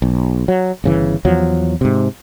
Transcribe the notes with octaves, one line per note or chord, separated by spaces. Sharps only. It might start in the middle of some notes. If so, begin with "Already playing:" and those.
B1
F#3
G1 C#3 E3
E2 F3 F#3
G#2 C3